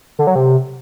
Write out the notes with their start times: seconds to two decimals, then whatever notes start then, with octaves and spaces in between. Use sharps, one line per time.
0.19 D3
0.27 F#3
0.36 C3